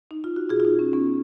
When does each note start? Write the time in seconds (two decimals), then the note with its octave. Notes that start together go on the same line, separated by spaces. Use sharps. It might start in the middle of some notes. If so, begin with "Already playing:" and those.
0.11 D#4
0.24 F4
0.36 F#4
0.49 B2 F4 G#4
0.60 F4
0.65 D#4
0.71 B2
0.79 C#4
0.93 B3 C#4